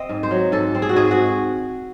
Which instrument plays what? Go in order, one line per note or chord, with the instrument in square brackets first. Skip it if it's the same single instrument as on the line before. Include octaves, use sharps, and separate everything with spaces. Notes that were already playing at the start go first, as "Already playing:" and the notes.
Already playing: [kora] C4 D#5
G#2
C5
F#3
G#2 A4
C4
G#4
F#4
G#2 G#4
F#4